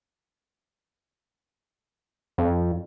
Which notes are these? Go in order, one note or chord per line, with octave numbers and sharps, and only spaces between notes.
F2